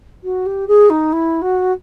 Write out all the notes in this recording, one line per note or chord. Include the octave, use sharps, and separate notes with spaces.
F#4
G4
G#4
D#4
E4
F#4